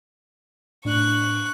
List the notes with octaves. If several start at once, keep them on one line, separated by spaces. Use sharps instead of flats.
A2 D4 C#6 F#6